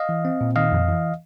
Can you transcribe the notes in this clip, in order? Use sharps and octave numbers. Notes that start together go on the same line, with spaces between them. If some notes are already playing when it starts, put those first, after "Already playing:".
Already playing: D#5 F5
E3
C4
A#2
D#3 D#5 F5
F2
E3